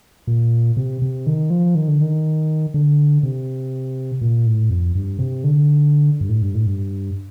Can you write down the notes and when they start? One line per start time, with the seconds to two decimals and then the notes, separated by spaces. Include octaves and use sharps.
0.27 A#2
0.77 C3
1.02 C3
1.27 D#3
1.50 F3
1.75 D#3
1.88 D3
2.01 D#3
2.74 D3
3.23 C3
4.21 A#2
4.46 A2
4.70 F2
4.95 G2
5.19 C3
5.44 D3
6.21 G2
6.29 A2
6.42 G2
6.55 A2
6.66 G2